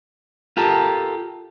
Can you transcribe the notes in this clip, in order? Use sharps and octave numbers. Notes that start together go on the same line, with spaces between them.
F4 G4 A4 A#4